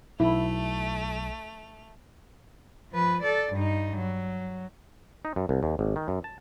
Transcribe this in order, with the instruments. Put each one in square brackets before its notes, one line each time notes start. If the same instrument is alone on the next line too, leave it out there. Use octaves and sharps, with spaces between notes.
[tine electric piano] B1 [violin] A3 F7 [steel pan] E4
[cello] F3 B4
A4 D5
G2 D#4
F#3
[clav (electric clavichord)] D#4
F#2
C2
D#2
G#1
D#3
F#2
A5